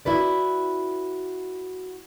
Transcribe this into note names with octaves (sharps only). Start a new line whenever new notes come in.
E4 F#4 B4 D5